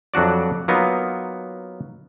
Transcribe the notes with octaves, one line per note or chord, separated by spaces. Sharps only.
F2 F#3 D4 F#4 D5
F#3 A#3 B3 D#4 F4